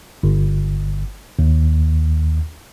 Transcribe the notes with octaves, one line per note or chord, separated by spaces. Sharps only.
G1
D#2